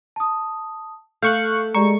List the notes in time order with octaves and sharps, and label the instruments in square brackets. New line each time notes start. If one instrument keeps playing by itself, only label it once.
[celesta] A5 D#6
[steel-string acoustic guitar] A3 [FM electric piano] F5 C#6 F#6 [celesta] G6
[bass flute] G#3 [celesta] G4 D5 A#5 [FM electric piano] C#6